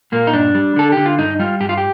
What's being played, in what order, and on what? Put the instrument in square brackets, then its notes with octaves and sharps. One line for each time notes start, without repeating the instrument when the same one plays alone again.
[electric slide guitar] A#2 A#3
D#4
G2 D4
G3
D3 A4
D3 G4
F4
G2 D#4
G3 F4
G2 G4
F4
G4